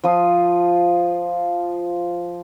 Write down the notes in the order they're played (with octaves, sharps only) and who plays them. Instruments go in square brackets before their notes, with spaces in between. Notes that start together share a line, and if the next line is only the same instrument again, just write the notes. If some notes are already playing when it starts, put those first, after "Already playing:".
[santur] F3 F4 D#6